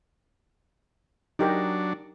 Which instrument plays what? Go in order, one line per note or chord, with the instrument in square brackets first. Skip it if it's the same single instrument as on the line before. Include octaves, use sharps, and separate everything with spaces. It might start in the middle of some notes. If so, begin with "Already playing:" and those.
[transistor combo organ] F#3 D4 [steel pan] D#4 G4 A#4